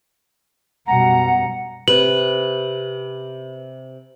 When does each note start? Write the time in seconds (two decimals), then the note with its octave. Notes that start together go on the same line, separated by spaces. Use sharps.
0.87 F#2 B2 G3 F#5 A#5
1.88 C3 B4 F#7